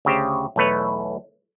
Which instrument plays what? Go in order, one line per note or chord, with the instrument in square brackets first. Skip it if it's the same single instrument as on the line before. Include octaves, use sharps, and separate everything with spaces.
[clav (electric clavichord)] D2 C#3 G4 C5
B1 E2 A3 B4 C#5